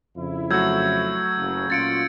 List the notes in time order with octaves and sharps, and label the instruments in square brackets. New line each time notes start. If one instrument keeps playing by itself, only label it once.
[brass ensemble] F2 C#3 E4
[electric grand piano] F#3 A3 F#4 [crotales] E6 G6 G#6
[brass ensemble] F#1 C#3
[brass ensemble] A#2 C#4 F4 [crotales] A6 C#7 D7